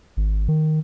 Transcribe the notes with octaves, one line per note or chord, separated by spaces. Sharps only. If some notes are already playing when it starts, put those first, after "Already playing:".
G#1
D#3